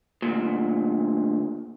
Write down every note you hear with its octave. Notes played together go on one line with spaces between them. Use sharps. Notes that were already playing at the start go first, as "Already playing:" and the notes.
D2 A#2